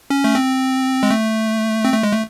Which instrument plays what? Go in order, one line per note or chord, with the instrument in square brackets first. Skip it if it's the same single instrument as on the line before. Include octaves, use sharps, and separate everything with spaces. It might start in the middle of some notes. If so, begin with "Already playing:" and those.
[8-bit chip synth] C#4
A3
C4
G#3
A3
C4
A3
G#3
A3